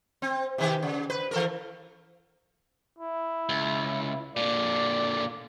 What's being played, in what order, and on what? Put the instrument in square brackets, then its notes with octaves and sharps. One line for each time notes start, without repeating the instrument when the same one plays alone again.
[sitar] C4
C3 D#3 G4
C#3
B4
E3 A4 A#4
[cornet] E4
[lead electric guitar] C#2
[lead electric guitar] A#2 D3 [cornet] D5